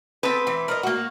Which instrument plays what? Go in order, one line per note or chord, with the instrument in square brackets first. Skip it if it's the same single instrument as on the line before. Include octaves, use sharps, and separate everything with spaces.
[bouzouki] B3 A5 [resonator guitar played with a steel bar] C4 B4
[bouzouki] E3
A#4 D5 D#5
A#3 F#4